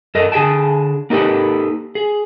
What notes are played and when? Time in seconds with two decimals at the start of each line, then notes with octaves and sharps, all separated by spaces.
0.15 F#2 A4 A#4 D#5
0.32 D3 G#4 E5 G5 A5
1.10 A#3 D#4 G4 A4 B4
1.95 G#4